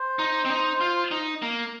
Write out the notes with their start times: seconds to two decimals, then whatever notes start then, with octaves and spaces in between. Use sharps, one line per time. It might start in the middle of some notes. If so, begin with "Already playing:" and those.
Already playing: C5
0.19 D#4
0.45 C4
0.50 D#4
0.81 F4
1.11 D#4
1.42 A#3